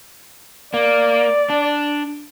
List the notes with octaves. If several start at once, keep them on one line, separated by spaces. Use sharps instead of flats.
A#3 D5
D4